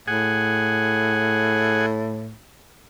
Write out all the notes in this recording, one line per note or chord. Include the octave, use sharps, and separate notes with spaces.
A2 G#4 F#5 G#5